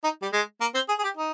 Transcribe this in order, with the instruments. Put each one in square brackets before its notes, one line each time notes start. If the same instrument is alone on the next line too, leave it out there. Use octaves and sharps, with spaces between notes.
[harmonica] D#4
G3
G#3
A#3
C4
G#4
G#4
G4
D#4